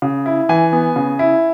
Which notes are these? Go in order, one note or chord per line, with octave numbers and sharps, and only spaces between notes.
C#3
E4
E3 G#5
B3
C#3
E4